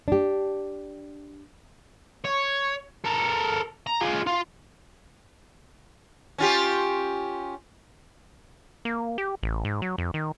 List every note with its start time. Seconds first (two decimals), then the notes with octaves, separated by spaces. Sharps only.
0.08 D4 G4
2.25 C#5
3.04 A4 A#4
3.87 A#5
4.01 F4 G#4
4.26 F4
6.38 C#4 F4 G4
8.85 A#3
9.18 G4
9.43 A1
9.65 G#2
9.82 F#3
9.98 F2
10.14 D#3